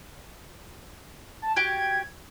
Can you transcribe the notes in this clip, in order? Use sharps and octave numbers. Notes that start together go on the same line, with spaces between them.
A5
F#4 G4 G5 G#6